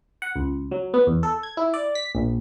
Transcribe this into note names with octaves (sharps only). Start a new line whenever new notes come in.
F#5
C#2
F#3
B3
E2
A4
G#6
E4
D5
B6
A#1